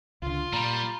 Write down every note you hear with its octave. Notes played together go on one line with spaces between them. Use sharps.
C#2 D3 F4
A#2 G3 A#5 B5